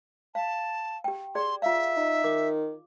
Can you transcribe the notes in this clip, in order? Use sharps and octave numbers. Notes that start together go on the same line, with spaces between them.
F5 A5
G4 G5
G#4 D5 C6
F4 E5 F5
D#4
D#3 D6